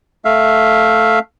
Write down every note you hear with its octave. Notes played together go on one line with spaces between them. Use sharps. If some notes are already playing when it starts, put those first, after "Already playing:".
A3 E5 F5